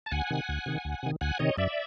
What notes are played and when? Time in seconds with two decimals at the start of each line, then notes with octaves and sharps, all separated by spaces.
0.06 A5
0.12 D2 F#5 G#5
0.30 C3 D#3
0.49 D2
0.66 C3 D#3
0.85 D2
1.03 C3 D#3
1.21 D2 F#5 G#5
1.39 C3 D#3 C#5 D#5
1.58 F#2 D5 E5